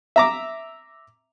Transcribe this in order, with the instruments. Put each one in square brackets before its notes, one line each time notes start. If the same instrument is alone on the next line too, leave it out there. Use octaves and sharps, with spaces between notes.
[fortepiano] E5 A#5 D6